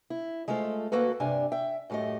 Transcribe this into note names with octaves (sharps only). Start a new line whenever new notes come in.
E4
G#3 A3 F4 A4 C5
D2 A#3 F#4 A4 B4
G2 C3 D4 G#5
E5 G5
F#2 A2 A3 G4 D#5